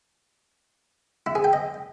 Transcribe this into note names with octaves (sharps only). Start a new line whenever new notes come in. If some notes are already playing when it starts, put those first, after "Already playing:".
E4
G#4
G5
D#5